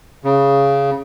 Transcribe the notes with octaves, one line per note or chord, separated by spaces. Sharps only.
C#3